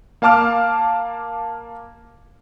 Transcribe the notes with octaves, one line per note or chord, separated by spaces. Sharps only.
A#3 F5 A5 D6 F6